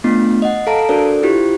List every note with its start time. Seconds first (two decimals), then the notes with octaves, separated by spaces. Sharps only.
0.04 A3 B3 D4 F4
0.42 D#5 F#5
0.67 A4 F5 A5 A#5 D7
0.89 D4 F#4 A4 A#4 C5 D5
1.23 E4 F4 G4 C5